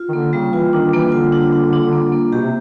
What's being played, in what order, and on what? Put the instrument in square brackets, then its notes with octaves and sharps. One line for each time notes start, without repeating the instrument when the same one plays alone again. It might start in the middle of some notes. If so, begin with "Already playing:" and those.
Already playing: [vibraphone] F4
[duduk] D#3
[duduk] D3 [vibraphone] A#3
[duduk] C#3 [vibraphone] G3
[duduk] E3 [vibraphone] F4
[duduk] D#3 [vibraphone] D4
[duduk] D#3
[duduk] E3 [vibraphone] A#3
[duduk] D3 [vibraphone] F4
[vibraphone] D4
D4
D4
A#3
A#3
[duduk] B2 [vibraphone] G4
[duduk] C3